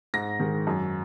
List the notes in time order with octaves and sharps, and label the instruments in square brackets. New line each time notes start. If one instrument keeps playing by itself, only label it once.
[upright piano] G#2 A#6
D#3 G#3
F#2